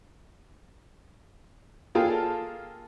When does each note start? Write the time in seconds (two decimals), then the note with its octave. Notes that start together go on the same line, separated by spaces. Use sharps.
1.95 A#3 F4 G#4 A4 G5 A5